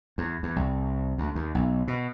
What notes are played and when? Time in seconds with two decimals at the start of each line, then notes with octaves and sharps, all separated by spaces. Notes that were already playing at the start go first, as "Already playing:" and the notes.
0.18 E2
0.43 E2
0.56 C2
1.18 D2
1.35 D#2
1.55 B1
1.88 B2